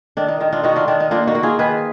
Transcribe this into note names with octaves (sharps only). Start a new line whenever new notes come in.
D#3 D4
D#4
D#3 D#4
D4 F4
D#3 D#4 F#4
D4 F4
D#3 D4
D#4
A#3 D4 F4
D#4 F#4
A#3
F4 G#4
D#3 G#4 B4